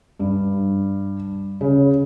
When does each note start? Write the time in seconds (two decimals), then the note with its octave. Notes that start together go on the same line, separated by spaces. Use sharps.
0.19 G2
1.61 C#3